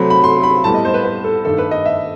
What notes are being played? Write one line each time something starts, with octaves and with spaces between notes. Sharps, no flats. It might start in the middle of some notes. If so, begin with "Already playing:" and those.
Already playing: C3 F#3 A3 C4 B5
B5
C6
B5
A2 G3 B3 A5
D#5
C5
B4
B4
A4
G2 D#3 A3 A4
B4
D#5
E5